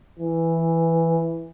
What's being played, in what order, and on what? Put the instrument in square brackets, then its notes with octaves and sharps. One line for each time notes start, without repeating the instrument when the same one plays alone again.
[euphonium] E3